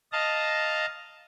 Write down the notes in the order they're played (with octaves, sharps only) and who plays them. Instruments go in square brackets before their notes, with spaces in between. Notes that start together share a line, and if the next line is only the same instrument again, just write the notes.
[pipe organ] D#5 F5 A5 A#5